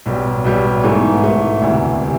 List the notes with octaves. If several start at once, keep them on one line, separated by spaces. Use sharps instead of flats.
B1 B2 G3
B1 B2 G3
G#2 E3 A3
G#2 E3 A3
E1 D2 C3 E3
C3 E3